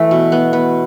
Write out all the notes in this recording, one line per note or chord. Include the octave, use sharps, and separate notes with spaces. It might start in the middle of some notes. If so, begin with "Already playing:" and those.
Already playing: E3 A3 E5
B2
B3
B3